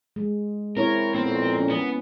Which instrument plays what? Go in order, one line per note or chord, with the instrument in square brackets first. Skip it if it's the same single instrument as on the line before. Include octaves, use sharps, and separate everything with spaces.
[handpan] G#3
[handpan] C4 E4 C#5 [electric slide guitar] A#4
[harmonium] F2 A#2 A#4 [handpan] B3 [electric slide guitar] C4
[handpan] C#4
[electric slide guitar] B3